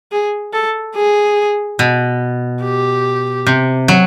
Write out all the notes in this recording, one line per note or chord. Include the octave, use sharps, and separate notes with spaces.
G#4
A4
G#4
B2
G4
C3
F#3